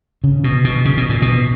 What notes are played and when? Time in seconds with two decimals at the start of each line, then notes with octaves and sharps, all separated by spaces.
0.24 C#3
0.44 B2
0.64 B2
0.85 C#3
0.97 B2
1.09 A#2
1.22 B2